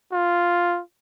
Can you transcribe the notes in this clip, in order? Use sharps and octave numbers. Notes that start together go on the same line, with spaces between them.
F4